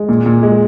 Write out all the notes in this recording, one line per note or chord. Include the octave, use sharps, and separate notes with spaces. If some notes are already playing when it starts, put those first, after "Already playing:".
Already playing: G#3
A#2
A#2
G#3